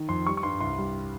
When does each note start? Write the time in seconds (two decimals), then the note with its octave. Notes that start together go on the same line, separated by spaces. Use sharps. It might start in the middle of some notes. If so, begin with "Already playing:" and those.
Already playing: D#3
0.09 F2 C6
0.27 G3 C#6
0.37 C#6
0.43 G2 C6
0.60 C2 C6
0.78 G3